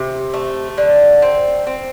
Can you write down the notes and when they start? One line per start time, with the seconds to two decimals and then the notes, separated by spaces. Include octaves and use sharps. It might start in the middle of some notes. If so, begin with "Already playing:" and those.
Already playing: C3
0.34 A3
0.78 D3
1.22 C4
1.67 C4